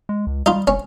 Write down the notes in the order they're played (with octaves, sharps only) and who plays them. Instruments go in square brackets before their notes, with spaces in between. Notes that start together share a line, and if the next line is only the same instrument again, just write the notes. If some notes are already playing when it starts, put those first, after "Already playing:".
[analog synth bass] G#3
C#2
[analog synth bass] G3 [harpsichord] D#4 F4
[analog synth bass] F1 [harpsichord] C#4